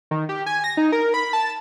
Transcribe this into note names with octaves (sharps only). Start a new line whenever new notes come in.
D#3
G4
G#5
A#6
D#4
A#4
B5
A5